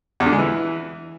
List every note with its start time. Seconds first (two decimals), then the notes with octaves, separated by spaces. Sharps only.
0.20 E2
0.26 D3
0.32 G#3
0.38 E3